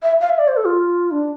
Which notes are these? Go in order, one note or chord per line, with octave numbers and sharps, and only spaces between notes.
E5
F5
E5
D5
C5
A4
F4
D4